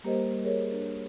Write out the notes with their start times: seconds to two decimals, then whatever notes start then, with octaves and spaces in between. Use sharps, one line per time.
0.04 G3 A#3 G4 A#4 C5 D#5
0.44 G#4 A#4 C#5
0.72 D4